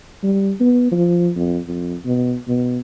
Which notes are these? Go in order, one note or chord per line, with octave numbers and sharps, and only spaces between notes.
G3
B3
F3
F2
F2
B2
B2